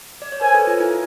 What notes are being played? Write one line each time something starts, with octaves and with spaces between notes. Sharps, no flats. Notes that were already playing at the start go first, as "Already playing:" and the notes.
D5
C#5
A#4 C5 G#5
A4 B4
F4
E4